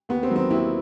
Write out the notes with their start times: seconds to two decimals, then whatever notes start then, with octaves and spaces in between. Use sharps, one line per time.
0.09 D#2 B3
0.23 C4
0.30 D#3 F#3
0.36 C4
0.50 D#2 E4